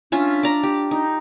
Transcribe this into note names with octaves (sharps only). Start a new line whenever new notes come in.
C#4 D4 F4 E5
D5 A#5
G4
D#4